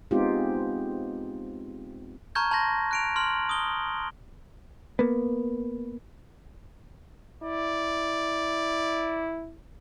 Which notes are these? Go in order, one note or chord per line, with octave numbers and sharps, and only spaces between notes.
G#3 B3 C4 D#4 F4 G4
A5 A#5 C#6 F6 G6 G#6
A5 C6 G6 A#6
F#6 D7 F7
C6 F6 F#7
D#6 G7
A#3 B3
E4 D5